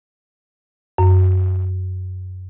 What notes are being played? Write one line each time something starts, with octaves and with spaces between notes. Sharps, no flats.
F#2